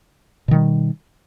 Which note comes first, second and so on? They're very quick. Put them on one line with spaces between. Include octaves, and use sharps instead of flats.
B2 D#3 G3